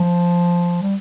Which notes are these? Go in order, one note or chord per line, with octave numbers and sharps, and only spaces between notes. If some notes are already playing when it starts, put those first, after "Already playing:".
Already playing: F3
G3